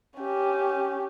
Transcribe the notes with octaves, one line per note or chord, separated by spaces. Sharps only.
C#4 G4